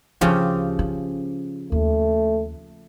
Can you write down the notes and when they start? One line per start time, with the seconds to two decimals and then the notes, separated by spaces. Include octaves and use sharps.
0.21 D2 C#3 F3 G4
0.79 C#4
1.72 D#2 A3